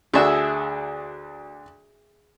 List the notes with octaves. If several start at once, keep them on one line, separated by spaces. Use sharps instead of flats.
D2 D4 F#4 G#4 E5